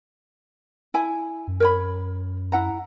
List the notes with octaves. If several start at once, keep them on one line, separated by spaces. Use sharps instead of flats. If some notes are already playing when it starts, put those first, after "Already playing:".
E4 G#5
F#2
A#4 C#5 B5
E4 F#5 A#5